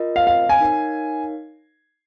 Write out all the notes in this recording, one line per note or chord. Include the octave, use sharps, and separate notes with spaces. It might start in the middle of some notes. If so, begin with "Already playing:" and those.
Already playing: F4 A#4 D#5
F5
F5
G#5
D#4 A#4 C#5 F5